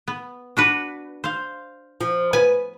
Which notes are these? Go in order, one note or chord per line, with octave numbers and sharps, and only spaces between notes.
B3
D4 F#4 B4
C5 F5
F3
B3 B4 G#5